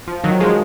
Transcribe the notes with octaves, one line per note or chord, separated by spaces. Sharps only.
F3
D#3 F#3
F3 G#3